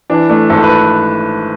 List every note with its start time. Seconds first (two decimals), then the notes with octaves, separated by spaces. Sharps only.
0.10 E3 D4
0.29 A3 D4
0.49 G#1 A4
0.63 B4